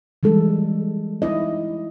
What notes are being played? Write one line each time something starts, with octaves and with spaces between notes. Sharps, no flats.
E3 G3 G#3 A4
E4 D#5